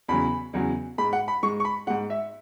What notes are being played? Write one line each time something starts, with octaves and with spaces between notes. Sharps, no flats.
E2 C#3 F#3 B5
E2 C#3 F#3
G#2 G#3 B5
F#5
B5
G#2 G#3 C#6
C#6
B5
G#2 G#3 F#5
E5